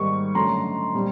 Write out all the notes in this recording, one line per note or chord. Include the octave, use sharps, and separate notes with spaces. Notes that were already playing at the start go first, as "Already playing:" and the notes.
Already playing: G#2 D#3 G3 A#3 C#6
F#2 D3 F#3 A3 A#5 C6
A#2 G3 C4